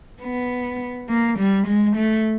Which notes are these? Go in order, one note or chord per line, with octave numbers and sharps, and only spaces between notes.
B3
A#3
G3
G#3
A3